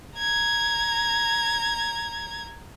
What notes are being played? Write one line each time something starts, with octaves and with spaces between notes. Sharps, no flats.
A#5 G#6